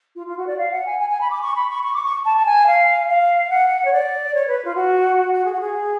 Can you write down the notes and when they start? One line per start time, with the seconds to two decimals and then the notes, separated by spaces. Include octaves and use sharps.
0.16 F4
0.27 F4
0.37 F#4
0.47 D5
0.58 F5
0.71 F#5
0.86 G#5
0.99 G#5
1.10 G#5
1.21 B5
1.31 D6
1.42 C#6
1.55 B5
1.69 C#6
1.83 C#6
1.94 D6
2.04 C#6
2.25 A5
2.37 A5
2.46 G#5
2.67 F5
3.09 F5
3.50 F#5
3.85 C#5
3.93 D5
4.34 C#5
4.48 B4
4.65 F4
4.75 F#4
5.17 F#4
5.32 F#4
5.45 G#4
5.53 F#4
5.60 G#4